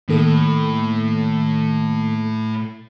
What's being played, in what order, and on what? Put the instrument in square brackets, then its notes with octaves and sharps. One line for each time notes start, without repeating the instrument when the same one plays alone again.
[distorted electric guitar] A2 [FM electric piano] D#3 A#3 A4